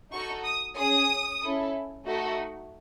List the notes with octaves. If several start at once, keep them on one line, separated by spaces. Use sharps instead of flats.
D#4 F#4 A4 C#6
D#6
C#4 G#4 D#6
C#4 E4 A4
A3 D#4 F#4 A4